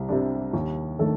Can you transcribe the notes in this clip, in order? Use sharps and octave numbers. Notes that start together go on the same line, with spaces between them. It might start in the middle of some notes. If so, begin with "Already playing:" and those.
Already playing: C2
C3 G3 D4
D#2
D#3 A3 D4 A4